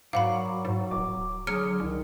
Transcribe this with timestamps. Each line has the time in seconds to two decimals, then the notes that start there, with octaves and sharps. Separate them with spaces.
0.13 G#2 F#3 A#4 D5 F5 F#5 B5
0.65 G#2
0.91 D1 D6
1.47 D3 F#3 G#4 F6 C#7
1.80 C2 D#3